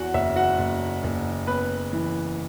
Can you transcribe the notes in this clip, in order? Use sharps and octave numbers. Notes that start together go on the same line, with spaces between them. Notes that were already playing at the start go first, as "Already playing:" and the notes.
Already playing: E2 F#4 F#5
F#1 E5
F#4 F#5
F#1
F#1
B3 B4 B5
E3